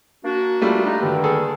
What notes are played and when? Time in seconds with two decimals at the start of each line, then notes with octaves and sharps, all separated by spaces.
0.25 A#3 D4 F#4
0.61 G3 A3 F4
0.85 D#4
1.01 G2 D3 D#3
1.24 G#4 A4